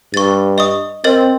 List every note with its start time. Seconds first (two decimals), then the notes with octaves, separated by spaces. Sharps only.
0.14 G2 C#6 A6
0.58 D#5 C#6 D#6
1.04 C4 A#4 D#5 A6